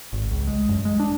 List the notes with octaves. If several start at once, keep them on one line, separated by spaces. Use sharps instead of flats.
G#1
C#2
G#3
F#2
G#3
D4